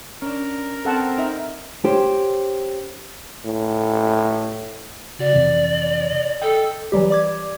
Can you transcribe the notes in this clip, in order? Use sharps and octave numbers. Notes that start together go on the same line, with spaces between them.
C#4 D4 A#4
C4 A4 F#5 A5
D#4 E5
C#4 G4 C5
A2
C#3 F#4 D5
F2 C3 E3
A4 D#5 G5
E3 F#3 G3 G4
D5 D6 G#6